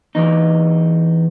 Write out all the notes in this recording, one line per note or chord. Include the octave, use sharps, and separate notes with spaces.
E2 D#4